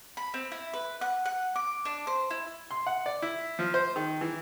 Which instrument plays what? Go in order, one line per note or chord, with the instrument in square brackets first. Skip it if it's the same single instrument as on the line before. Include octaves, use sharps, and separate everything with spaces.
[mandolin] B5
C4
E4
B4
F#5
F#5
D6
D4
C5
E4
[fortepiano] C6
F#5
D5
E4
F3
C5
D#3
E3